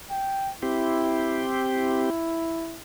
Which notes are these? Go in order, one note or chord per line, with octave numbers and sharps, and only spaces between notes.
G5
C4 E4 G4
E4